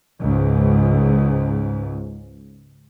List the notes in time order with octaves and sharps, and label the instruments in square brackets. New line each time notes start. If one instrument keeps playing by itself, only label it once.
[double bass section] C#2 G#2